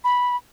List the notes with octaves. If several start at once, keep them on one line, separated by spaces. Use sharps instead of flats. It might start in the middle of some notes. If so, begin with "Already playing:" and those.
B5